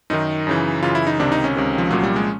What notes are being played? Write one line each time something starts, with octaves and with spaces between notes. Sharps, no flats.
F#2 D#3 D#4
F#2 C#3 E3
F#2 C#3 E3 F4
E4
D#4
C#2 C3 D#3 D4
D#4
C#4
C#2 C3 D#3
F3
C2 A#2 F3 F#3
G3
G#3